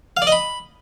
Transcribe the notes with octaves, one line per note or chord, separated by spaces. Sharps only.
F5
D5
D#5
B5